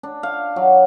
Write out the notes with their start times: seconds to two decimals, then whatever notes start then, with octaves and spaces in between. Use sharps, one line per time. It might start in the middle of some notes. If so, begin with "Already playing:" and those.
0.03 D4
0.23 F5
0.56 F#3